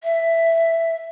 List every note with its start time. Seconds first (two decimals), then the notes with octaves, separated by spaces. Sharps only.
0.04 E5